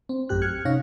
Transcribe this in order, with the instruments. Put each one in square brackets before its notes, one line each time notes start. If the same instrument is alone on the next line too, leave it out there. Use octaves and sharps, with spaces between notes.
[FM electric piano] C4
A1 F#2 A2 G4 F#6
F6 F#6 G#6 C#7
C3 C#4 D#4 C#5 F5 A#6